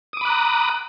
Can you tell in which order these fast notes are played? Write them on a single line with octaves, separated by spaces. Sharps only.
D#6 D6 B5 F#6 A#5